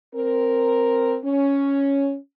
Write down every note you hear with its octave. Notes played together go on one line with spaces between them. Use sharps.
C4 A#4
C#4